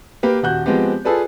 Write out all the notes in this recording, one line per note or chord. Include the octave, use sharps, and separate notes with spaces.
A#3 G4 B4
D#1 F#4 F#6 G6
F3 G#3 B3 C4 G4
F4 G#4 A4 B4 D5